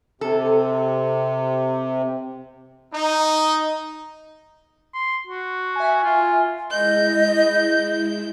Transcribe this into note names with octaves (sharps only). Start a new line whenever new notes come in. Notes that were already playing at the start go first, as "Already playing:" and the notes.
C3 A4
D#4
C6
F#4
E5 G#5
F4
G#3 E4 D#5 G6